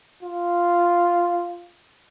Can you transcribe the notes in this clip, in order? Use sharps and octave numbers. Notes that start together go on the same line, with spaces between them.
F4